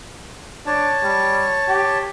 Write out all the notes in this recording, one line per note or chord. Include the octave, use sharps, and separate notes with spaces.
D4 C#5 A5
G3
G4